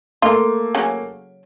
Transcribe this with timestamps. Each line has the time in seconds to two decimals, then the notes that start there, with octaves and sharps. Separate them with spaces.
0.22 A3 A#3 F4 A4
0.75 C#3 F#3 C#4